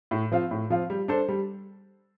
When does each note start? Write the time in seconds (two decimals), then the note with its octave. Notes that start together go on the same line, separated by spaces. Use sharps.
0.11 A2
0.31 F3 C4 F4
0.51 A2
0.70 F3 C4 F4
0.90 G3
1.08 D4 A4 C5
1.28 G3